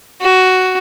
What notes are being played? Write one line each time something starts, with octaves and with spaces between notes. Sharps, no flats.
F#4